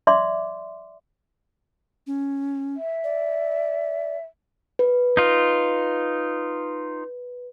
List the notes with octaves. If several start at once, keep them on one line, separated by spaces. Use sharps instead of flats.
D5 E5 C6 D6
C#4
E5
D5
B4
D#4 F4